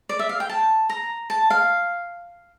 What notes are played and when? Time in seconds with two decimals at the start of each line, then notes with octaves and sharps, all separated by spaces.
0.09 D5
0.19 E5
0.29 F5
0.40 G5
0.49 A5
0.89 A#5
1.30 A5
1.50 F5